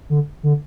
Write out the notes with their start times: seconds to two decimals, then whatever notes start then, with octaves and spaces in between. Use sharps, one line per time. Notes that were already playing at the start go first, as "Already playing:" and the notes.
0.10 D3
0.43 D3